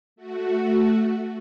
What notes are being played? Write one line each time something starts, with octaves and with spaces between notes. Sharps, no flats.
A3 F#4